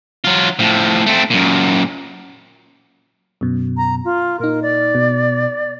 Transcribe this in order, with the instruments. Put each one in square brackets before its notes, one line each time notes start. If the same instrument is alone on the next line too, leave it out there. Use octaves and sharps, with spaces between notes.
[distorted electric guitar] F#3 F4
A2 F3
A3 C4
F#2 A#2
[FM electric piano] F#2 B2
[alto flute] A#5
F4
[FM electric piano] A#2 D#4 [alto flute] A#4
[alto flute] D5
[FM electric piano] B2